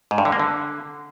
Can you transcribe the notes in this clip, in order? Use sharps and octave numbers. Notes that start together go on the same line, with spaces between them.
G#2
G2
D3
A#3
D3